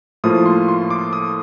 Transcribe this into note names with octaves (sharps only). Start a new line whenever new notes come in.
A2 F3 A#3 F4 D#6
C6
C6
D6
D#6